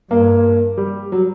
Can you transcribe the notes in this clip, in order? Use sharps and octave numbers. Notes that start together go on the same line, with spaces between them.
G2 A#3
G3
F#3